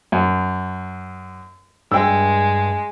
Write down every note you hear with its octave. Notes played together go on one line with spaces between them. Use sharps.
F#2
G2 G#3 G5 E6